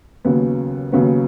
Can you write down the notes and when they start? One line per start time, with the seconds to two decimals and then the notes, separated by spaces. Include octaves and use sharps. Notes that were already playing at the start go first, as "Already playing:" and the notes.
0.25 D#2 C#3 F#3 B3
0.92 D#2 C#3 F#3 B3